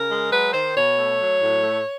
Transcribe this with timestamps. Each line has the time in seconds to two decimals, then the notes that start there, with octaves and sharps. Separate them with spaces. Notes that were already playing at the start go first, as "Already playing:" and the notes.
Already playing: C#3 A#4
0.09 G#3
0.31 F#3 B4
0.53 D#3 C5
0.75 B2 C#5
0.97 A3
1.18 F#3
1.41 A2
1.63 A3